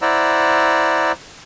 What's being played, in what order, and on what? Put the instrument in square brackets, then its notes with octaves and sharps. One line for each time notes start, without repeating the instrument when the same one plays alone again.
[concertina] E4 C5 D5 F#5 A#5 E6